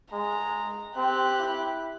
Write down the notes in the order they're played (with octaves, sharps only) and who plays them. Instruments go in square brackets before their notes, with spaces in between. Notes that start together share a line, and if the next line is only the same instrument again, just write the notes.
[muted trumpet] G#3 [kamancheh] A#5
[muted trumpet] C4 [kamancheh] G4 F#6
[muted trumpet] E4